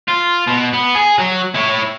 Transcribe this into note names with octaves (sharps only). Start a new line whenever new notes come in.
F4
B2
B3
G#4
F#3 F#4
E4 C#5